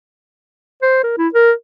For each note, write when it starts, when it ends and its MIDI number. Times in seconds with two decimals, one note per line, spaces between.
0.82 1.02 72
1.04 1.14 70
1.18 1.28 64
1.34 1.52 70